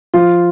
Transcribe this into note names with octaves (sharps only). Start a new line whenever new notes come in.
F3 F4